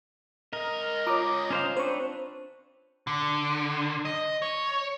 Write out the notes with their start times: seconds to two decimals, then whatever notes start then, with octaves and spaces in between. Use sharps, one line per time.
0.53 C#2 A#4 D#5
1.07 F4 C#5 A#5 D6 D#6
1.50 C#4 C5 F5
1.77 C4 D4 B4 C5 C#6
3.07 D3
4.05 D#5
4.42 C#5